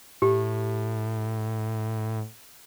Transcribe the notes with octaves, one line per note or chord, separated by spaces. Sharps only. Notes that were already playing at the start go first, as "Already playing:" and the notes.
A2 G4